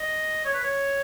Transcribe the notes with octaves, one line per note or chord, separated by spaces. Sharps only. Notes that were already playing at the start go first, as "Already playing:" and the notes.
Already playing: D#5
C#5
B4
C#5